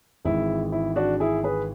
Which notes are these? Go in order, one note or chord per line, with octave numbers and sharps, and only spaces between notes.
G#1 G#2 E3 E4
E4
D4 F#4
E4 G#4
G#4 B4